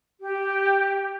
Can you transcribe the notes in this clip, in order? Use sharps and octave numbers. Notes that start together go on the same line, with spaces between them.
G4